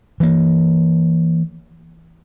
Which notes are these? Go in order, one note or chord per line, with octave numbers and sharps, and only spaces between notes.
E3 A#3